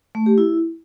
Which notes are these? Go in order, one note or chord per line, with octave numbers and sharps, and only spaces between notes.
A3
G4
E4